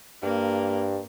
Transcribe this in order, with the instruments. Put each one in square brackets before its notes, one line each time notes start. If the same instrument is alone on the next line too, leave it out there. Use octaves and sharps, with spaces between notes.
[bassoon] G2 [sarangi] A#3